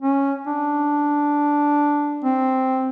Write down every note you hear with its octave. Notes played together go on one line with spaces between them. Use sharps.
C#4
D4
C4